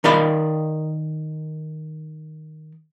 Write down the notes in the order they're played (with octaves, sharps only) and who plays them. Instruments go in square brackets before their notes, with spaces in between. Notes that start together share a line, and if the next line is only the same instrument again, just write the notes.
[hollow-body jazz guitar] D#3 D#4 A#4 D5 F5 B5